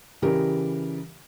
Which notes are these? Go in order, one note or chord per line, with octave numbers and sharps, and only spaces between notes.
C#3 E3 G3 G4 A#4